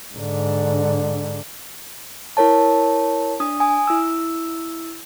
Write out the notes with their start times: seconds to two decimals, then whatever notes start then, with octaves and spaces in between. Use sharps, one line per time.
0.15 G#2 D3
2.37 E4 A#4 C#5 A5
3.40 D4 D#6
3.60 G#5 D#6
3.87 E4 E6